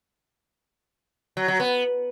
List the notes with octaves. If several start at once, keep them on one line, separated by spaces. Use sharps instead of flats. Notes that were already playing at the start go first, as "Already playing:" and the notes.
F#3
F#3
B3